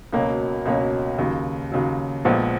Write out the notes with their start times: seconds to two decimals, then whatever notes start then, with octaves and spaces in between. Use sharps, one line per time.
0.13 C#2 B2 F#3 A#3 C#4
0.66 C#2 B2 F#3 A#3 C#4
1.18 D#2 C#3 F#3
1.72 D#2 C#3 F#3
2.25 A#1 A#2 F3 G#3 B3